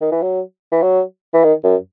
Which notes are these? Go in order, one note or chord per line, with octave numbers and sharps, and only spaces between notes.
D#3
E3
F#3
E3
F#3
E3
D#3
F#2